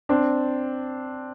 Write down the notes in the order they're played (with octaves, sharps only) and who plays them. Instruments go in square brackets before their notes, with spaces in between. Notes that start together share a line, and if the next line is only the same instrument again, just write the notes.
[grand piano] C4 D4